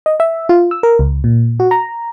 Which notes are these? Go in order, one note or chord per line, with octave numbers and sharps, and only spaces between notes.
D#5
E5
F4
E6
A#4
C#2
A#2
F#4
A#5